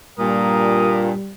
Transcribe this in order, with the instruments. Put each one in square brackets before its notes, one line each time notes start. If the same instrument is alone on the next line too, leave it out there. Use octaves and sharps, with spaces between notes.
[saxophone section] G2 A#2 [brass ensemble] G3 [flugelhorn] A#4 [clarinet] D#6